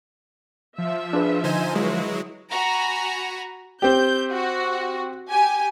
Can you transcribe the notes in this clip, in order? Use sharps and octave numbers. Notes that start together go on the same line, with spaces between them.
F3 E5
D4 G#4 B4
D3 D#4 C5 G#5
F#3 G#3 E4 F#4 B4
F#4 G#5 A#5 B5
C4 G4 G6
F#4
G4 G#5